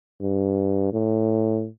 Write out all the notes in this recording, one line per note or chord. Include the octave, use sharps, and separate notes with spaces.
G2
A2